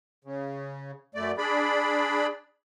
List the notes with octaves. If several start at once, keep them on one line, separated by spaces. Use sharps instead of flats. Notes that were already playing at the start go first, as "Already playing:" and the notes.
C#3
F#2 A3 D5
D4 G#4 D5 B5